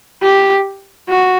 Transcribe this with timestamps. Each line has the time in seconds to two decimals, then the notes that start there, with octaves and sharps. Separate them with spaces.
0.22 G4
1.09 F#4